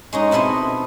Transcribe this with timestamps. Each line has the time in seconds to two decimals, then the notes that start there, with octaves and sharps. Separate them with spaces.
0.13 G#3 C#4 D#4
0.31 B2 C4 E4 A4 D#5